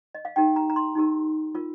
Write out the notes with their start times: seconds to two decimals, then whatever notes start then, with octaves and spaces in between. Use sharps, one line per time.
0.15 D#5
0.25 F5
0.36 D#4 G4 A#4 G5
0.56 A#5
0.70 A#5
0.76 C6
0.95 D#4 G4 A#4
1.55 F4 A#4